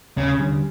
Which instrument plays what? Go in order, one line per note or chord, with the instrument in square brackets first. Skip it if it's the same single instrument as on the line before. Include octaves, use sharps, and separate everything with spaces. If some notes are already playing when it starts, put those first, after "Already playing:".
[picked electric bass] D#2 [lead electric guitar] C#3
[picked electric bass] D3 G3